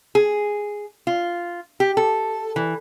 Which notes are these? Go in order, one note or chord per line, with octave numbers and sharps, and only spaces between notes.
G#4
F4
G4
A4
E3